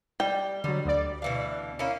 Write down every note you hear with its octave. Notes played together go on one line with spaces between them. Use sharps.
G3 G5
D3 F#3 G3
D2 D5
B2 E3 F5
A#3 C#4 E4